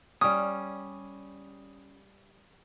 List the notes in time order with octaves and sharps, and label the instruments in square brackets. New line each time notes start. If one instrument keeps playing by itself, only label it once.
[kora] G3 C#4 [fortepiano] D#6